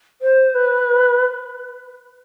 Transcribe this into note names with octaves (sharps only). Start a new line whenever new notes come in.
C5
B4